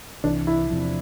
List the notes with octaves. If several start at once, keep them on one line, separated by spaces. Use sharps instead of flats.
C2 C3 E3 D4
E4
E2 C3 F3